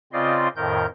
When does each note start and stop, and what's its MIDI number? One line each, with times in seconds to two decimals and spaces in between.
0.13 0.48 49
0.13 0.48 60
0.13 0.48 65
0.13 0.48 74
0.13 0.48 75
0.13 0.48 84
0.56 0.86 41
0.56 0.86 45
0.56 0.86 51
0.56 0.86 70
0.56 0.86 91